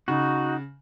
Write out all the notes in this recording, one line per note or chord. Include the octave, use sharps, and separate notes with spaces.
C#3 D#4 F#4